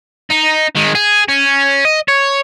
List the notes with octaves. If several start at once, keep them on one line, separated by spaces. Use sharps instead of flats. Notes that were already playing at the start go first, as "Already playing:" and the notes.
D#4
D#3 G#3
G#4
C#4
D#5
C#5